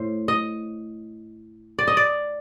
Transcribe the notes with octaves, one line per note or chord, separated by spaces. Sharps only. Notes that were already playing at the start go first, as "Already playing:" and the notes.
Already playing: A2 C5
D#5
D5
D#5
D5